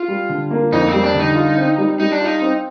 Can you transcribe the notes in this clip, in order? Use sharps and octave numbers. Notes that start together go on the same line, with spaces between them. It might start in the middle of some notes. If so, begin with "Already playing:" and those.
Already playing: F4
G3
D3
A#3
F2 D#4
G3 C4
D4
D3 D#4
F4
C4
G3
G3 D#4
D4
D#4 F4
C4